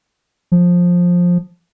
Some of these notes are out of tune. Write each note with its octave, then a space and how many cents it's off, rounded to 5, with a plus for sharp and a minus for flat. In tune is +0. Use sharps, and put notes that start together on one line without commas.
F3 +15